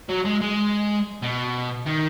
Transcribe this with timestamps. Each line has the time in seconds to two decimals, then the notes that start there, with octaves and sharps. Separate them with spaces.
0.09 F#3
0.25 G#3
0.41 G#3
1.22 B2
1.86 D#3